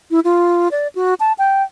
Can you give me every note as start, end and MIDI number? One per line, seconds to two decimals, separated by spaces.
0.11 0.20 64
0.24 0.68 65
0.71 0.88 74
0.95 1.14 66
1.20 1.33 81
1.38 1.63 79